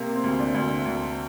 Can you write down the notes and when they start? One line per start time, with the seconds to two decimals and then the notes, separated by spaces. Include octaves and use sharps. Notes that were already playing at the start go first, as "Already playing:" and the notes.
Already playing: C3 A#3
0.16 C4
0.24 D2
0.40 D4
0.54 D2 D4
0.63 C4
0.85 D2